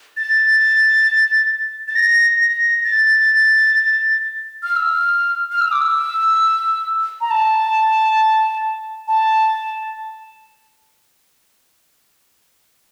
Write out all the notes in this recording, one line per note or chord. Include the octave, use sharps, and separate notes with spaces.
A6
A6
A#6
A#6
A6
F6
E6
F6
F6
E6
D6
E6
A#5
A5
A5